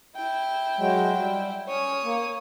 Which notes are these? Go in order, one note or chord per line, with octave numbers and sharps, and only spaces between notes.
E4 G5
F#3 G#3
G3
C#4 C#5 D#6
A#3